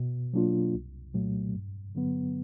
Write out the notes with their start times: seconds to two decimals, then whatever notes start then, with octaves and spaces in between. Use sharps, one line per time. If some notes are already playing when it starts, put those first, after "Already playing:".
Already playing: B2
0.33 F#3 A#3 D4 F4
0.74 C2
1.14 A#2 F#3 A3
1.54 G2
1.95 D3 F#3 B3